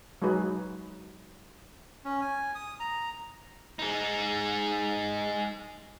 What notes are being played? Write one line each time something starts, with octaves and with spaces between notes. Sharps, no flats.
F#3 G#3 D#4 G#4 B4
C#4
G#5
D#6
A#5
G#3 D#4